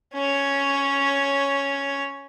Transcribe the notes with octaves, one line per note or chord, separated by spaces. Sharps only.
C#4 C#5